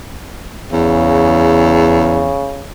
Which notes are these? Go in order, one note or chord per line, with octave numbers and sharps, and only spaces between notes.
E2 C#3